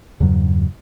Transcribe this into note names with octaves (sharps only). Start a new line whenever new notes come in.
E2 G2 C#3 F#3